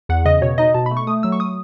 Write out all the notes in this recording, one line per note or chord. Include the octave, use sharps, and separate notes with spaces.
E2 F#5
C#3 D#5
B2 C#5
D#4 D#5
B2 A5
B5
A3
C#6
A3 D#6
F#3 E6
C#6
D#6